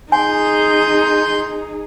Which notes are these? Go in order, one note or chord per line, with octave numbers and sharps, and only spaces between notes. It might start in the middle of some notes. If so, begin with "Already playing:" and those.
D#4 G#4 G#5 C6 G6